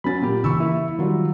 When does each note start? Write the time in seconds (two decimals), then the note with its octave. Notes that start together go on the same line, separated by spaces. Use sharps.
0.04 F#3 C#4 B5 A6
0.21 A#2 G4
0.44 C#3 E3 B5 C#6 E6
0.60 A#3 E4
0.99 D#3 F#3 G3 F4